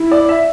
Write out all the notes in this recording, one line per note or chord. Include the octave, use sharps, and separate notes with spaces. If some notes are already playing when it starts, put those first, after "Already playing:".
Already playing: E4
D5
E5